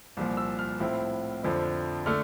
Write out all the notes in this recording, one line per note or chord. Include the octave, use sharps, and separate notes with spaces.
C2 A#2 F3
E6
F6
A2 F3 C4 E4
F2 D3 F3 C4 E4
D3 A3 F6